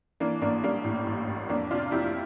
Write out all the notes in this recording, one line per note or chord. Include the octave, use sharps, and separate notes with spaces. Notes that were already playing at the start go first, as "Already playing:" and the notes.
E3 A#3 D4
A1 A#3 D4
G3 A#3 D4
A2
A1
A1
F2 A#3 D4
C3 D4 F4
F2 E4 G4